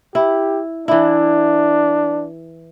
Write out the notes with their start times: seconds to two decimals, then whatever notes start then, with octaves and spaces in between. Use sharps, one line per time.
0.15 E4 G4
0.88 E3 D4 E4